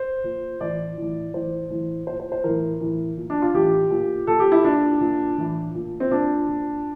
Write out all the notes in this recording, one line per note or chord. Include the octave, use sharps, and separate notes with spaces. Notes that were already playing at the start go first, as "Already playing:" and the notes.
Already playing: C5
A#2
A2 E3 D5
A2 E3
A2 E3 C5
A2 E3
A#2 C5
C5
C5
A2 E3 A#4
A2 E3
A#2
D4
F4
A2 E3 G4
A#2
A#2 A4
G4
E4
A#2 D4
A#2
A2 E3
A#2
C4
A#2 D4
A#2